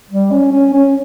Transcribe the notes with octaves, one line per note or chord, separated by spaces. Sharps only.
G3
C#4
C#4
C#4